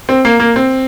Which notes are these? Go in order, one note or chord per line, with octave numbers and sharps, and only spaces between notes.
C4
A#3
A#3
C4